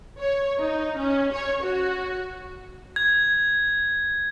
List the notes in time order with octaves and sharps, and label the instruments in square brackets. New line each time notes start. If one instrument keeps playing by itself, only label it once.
[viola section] C#5
D#4
C#4
C#5
F#4
[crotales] G#6